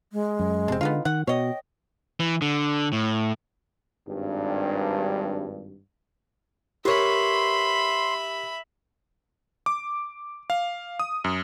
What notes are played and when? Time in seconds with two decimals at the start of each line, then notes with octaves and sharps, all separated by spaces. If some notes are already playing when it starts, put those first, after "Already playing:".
0.13 G#3
0.39 F#2
0.68 F1 C3 C4 D4
0.81 D3 B3 D#4 F4
1.05 D#3 F#5
1.27 B2 C#5 D#5 G5
2.20 E3
2.42 D3
2.93 A2
4.07 G#1 G2
6.85 G4 A#4 B4 C#5 E5 B5 C6
9.66 D6
10.50 F5
11.00 D#6
11.24 F#2